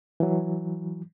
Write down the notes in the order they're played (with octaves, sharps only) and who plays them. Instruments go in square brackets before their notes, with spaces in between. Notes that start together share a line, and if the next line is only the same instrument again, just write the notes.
[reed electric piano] E3 F#3